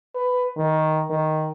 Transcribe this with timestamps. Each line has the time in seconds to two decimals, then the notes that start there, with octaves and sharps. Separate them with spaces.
0.15 B4
0.57 D#3
1.10 D#3